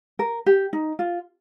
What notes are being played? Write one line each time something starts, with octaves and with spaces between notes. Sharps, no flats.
A#4
G4
D#4
F4